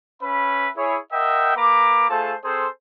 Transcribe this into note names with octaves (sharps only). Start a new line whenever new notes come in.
C#4 B4 E5 B5
E4 G#4 C#5
A#4 D#5 E5 F#5 G5
A#3 B4 A#5 D6
A3 F4 G#4 A4 C5 A5
C4 G#4 A4 C5